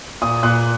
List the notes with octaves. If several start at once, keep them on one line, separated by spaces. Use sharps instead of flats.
A#2 D#6
A#2 F#6